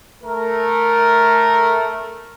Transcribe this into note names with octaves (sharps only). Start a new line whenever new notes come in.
A3 A#4